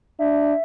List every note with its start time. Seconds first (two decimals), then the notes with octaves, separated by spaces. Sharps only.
0.19 D4 E5